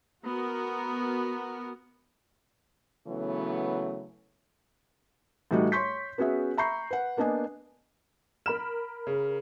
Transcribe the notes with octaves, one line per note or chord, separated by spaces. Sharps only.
B3 F#4 A#4
C#3 E3 F#3 A3 B3
A2 E3 G3 D#4 F#4
C#5 C6 C#6 G6 B6
B3 C#4 F#4 G#4 E5
E5 A#5 B5 C#6 G6 C7
B4 F#5
A#3 B3 D4 D#5 G#5
A#4 B5 F6 E7
C#3